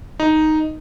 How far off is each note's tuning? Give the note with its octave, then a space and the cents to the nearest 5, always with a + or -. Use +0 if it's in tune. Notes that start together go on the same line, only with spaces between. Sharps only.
D#4 +0